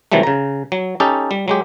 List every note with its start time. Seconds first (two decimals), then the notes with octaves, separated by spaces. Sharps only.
0.12 C3 D#3 E3 F#3 G3 A3
0.23 C#3 A#5
0.72 F#3
1.00 C#4 D#4 G4 A4
1.31 G3
1.48 F#3 G#3 G4